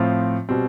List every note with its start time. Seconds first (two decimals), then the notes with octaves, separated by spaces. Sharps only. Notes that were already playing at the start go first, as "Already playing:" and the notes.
Already playing: A2 F3 C4 F4
0.49 B2 G3 C4